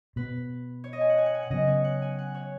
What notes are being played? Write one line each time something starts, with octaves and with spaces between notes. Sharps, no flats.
B2 B3 B4
C#5
D#5
G#5
F#5
G#5
F#5
G#5
F#5
C#3 F#3 B3 D#5
C#5
F#5
G#5
F#5
C#5